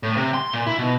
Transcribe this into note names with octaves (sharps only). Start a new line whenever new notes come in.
A2
C3
C6
A#2
E4
B2